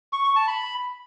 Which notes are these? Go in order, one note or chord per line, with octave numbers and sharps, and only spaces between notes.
C#6
C#6
A5
B5